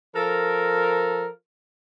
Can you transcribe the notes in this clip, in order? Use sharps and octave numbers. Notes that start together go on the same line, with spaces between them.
F3 A4 A#4